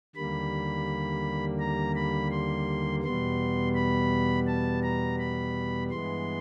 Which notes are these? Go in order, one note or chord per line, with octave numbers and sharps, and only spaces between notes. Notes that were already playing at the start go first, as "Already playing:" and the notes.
D#2 D3 G3 A#3 B5
A#5
B5
C6
E2 B2 G3 B3 C6
B5
A5
A#5
B5
G2 E3 G#3 B3 C6